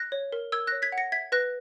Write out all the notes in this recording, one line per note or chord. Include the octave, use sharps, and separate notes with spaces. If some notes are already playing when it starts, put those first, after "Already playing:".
Already playing: F#6 A#6
C#5
A#4
A#4 E6 G#6
C#5 F#6 A#6
G#6 B6
F#5
A#6 C#7
E5 G#6 B6
B4 F#6 A#6